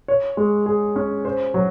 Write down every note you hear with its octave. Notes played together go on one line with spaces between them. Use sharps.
C#5
G#3
G#4
C#4
C5
F#3